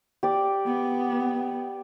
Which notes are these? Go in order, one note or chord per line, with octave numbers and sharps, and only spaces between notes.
G4 D5
B3